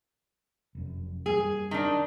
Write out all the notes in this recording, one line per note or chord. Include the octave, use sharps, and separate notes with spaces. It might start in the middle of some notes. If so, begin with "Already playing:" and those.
F1 F#2
F#2 G3 A#3 G#4
D#3 D4